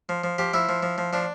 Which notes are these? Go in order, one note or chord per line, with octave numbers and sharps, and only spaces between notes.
F3
F3
F3 G4
F3 E4
F3
F3
F3
F3 D4